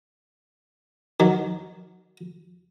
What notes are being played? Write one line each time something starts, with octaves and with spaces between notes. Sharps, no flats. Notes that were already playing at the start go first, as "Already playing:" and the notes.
D#3 F#3